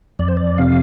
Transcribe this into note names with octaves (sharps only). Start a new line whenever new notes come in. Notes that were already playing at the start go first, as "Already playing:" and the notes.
F2 D5
C5
D5
C3 F5